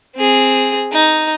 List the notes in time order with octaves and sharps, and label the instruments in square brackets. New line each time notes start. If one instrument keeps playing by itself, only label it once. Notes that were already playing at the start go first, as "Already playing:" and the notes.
[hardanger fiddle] C4 G#4
D#4